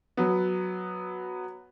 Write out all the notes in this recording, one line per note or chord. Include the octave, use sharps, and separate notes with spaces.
F#3 B3